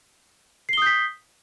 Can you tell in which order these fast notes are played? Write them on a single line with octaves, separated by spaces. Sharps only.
C7 G7 D#6 G6 B6